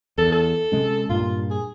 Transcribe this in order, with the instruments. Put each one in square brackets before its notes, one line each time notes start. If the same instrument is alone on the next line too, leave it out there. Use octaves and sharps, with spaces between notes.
[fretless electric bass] E2 [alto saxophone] A4
[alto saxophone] A4
[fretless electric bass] C3 G#3 C#4
[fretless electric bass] G2 A#2 [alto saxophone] F4
[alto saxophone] G#4